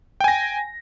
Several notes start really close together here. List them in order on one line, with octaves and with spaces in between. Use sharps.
G5 G#5 A#6